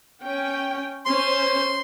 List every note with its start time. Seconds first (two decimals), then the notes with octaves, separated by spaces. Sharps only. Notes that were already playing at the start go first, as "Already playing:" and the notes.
0.21 C#4 G5
1.06 C#4 C5 C6